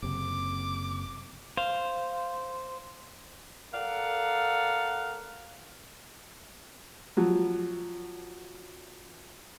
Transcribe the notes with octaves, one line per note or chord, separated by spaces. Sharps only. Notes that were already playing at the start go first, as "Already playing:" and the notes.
F#1 C3 D6
C5 F5
A4 A#4 D5 F5 F#5
F3 F#3